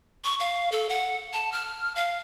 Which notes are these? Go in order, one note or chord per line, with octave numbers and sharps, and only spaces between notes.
C#6
F5
A4
F#5
A5
F6
F5